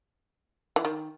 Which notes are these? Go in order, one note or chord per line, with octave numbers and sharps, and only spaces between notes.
E3
D#3